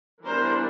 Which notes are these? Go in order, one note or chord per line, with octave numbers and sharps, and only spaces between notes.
E3 G3 B3 D4 A#4 C5